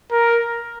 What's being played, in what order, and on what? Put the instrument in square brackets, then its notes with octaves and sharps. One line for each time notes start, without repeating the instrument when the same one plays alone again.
[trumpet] A#4